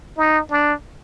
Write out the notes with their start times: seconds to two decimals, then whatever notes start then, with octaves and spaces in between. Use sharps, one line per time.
0.18 D#4
0.51 D4